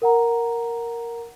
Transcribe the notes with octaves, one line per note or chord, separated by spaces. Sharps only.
A#4 F#5 A#5